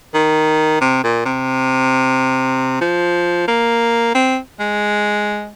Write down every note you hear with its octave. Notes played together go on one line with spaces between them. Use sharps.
D#3
C3
A#2
C3
F3
A#3
C4
G#3